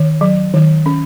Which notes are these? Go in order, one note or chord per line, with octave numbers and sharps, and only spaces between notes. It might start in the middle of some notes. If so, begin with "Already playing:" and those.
Already playing: D#3 C#5
F#3
D#3
C#4